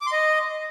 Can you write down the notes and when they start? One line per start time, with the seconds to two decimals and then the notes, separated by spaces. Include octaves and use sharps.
0.01 D6
0.07 C6
0.12 D#5